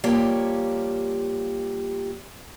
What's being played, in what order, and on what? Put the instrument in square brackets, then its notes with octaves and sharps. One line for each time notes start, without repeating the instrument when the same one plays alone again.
[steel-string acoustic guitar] F3 G3 A#3 G4 C#5